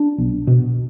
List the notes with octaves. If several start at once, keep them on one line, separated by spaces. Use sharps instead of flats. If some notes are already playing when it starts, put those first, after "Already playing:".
Already playing: D4
B1
B2